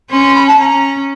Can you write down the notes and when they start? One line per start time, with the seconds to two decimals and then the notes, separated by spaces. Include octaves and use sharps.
0.11 C#4 C6
0.23 C6
0.35 B5
0.47 A5
0.58 C#4 A#5